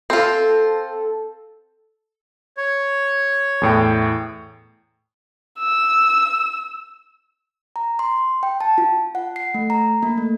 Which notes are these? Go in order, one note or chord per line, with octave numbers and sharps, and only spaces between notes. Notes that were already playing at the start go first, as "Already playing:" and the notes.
C4 F4 A4
C#5
E2 A2 G5
E6
A#5
C6
G5
A5
F4
F#5
C7
A3
A#5
A#3
A3